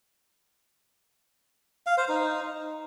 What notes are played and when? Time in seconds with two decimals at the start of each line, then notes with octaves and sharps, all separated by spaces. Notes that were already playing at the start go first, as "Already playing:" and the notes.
1.86 F5
1.98 C5
2.09 D#4